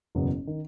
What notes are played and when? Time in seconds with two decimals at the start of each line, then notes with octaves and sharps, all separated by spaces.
0.15 F#1 E2 B2 F#3 B3
0.47 D#3